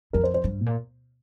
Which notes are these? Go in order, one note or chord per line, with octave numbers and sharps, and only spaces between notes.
F2 A#4
C5
C5
G2
A#2